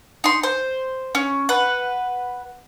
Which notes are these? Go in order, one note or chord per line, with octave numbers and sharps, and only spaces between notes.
D#4 C6
C5
C#4
B4 F#5